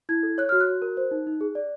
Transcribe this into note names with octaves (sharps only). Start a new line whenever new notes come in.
E4 G#6
A4
C#5 F#6
F#4 F6
F#6
F#4
A#4
C5
D#4
D#4
G#4
D5